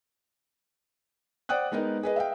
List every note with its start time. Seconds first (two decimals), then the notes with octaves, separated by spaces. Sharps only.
1.49 C5 D5 F#5 G5 D#6 F#6
1.72 G#3 B3 D#4 A#4 D#5
2.03 G#4 B4 D#5
2.16 E5 F5 G5